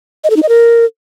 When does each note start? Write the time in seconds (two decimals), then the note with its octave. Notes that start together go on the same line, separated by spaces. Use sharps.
0.24 D#5
0.30 A4
0.36 D#4
0.43 D#5
0.49 A#4